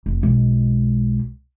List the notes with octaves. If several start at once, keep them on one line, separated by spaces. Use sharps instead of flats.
F1
B1 G#3